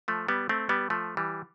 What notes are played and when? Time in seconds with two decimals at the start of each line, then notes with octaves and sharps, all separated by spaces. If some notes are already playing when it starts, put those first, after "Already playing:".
0.08 F3 A3
0.28 G3 B3
0.49 A3 C4
0.69 G3 B3
0.90 F3 A3
1.17 E3 G3